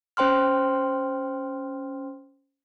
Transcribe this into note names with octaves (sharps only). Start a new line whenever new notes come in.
C#4 C5 G5 C6 F6